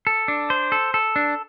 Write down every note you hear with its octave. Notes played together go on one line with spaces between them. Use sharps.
A4
D4
C5
A4
A4
D4